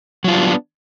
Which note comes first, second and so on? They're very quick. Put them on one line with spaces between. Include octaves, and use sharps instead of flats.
F#3 F4 G3 D4 B3